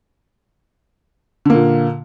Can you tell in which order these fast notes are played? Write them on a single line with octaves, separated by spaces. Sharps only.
D3 A#3 A#2